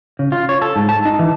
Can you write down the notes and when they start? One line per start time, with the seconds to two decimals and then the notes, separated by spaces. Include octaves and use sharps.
0.19 C#3
0.32 F4
0.49 C#5
0.62 A4
0.76 G#2
0.89 A5
1.05 D#4
1.19 E3